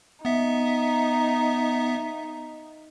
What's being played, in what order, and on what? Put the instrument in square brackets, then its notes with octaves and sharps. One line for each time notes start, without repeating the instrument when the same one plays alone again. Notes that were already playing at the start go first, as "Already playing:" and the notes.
[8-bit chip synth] B3 E5 [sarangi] D#4